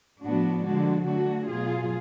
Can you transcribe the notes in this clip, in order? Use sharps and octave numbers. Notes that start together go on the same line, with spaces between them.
A2 F3 B3 D4 F#4
D3 F3 G#3 D4 F#4
D3 F#3 A3 D4 F#4
B2 F#3 A3 F4 G#4